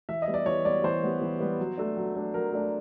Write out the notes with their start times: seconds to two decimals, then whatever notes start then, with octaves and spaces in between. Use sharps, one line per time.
0.09 E3 E5
0.22 D#5
0.27 G3 B3
0.34 D5
0.46 E3 C#5
0.65 G3 B3 D5
0.84 E3 C5
1.03 G3 B3
1.22 E3
1.41 G3 B3
1.59 F#3
1.78 A3 D4
1.97 F#3
2.16 A3 D4
2.34 F#3 A#4
2.52 A3 D4